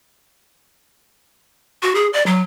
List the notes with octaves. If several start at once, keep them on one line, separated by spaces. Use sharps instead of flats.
F#4
G#4
D5
F#3